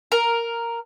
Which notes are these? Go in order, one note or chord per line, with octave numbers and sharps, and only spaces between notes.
A#4